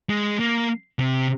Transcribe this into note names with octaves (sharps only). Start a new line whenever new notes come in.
G#3
A#3
C3